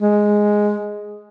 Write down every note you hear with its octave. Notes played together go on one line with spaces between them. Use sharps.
G#3